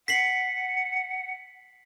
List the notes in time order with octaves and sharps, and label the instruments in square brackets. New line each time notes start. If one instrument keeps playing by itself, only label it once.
[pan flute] F#5 [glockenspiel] B6 C7 F#7